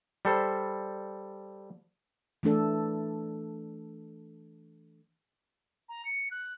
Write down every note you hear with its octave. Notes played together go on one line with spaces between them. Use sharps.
G3 A4 C5
E3 A3 D4 A4
A#5
C#7
F#6